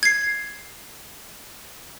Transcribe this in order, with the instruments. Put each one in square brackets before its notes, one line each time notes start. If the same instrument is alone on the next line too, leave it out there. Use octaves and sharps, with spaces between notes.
[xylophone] G#6 C7